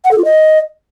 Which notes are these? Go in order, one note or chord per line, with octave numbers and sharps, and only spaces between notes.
F#5
A4
F4
D#5